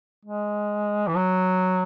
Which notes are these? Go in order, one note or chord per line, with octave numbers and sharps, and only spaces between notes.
G#3
E3
F#3